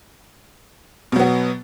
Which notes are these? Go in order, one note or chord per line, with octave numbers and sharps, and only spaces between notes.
B2 F#3 B3